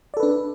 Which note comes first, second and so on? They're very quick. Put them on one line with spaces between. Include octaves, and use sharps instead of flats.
D5 A4 B4 D4